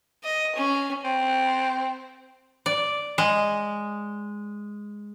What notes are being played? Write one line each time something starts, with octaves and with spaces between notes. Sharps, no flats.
D#5
C#4
C4
D5
G#3